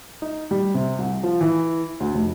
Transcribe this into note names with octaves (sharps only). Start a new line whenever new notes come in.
D#4
G3
C3
C2
F3
E3
D2
F1